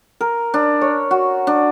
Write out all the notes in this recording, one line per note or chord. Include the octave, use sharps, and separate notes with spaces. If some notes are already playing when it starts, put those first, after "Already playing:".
A#4
D4
C#5
F#4
D4